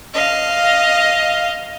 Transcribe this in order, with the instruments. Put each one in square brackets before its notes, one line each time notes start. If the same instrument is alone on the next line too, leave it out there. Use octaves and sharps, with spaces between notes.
[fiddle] D#5 F5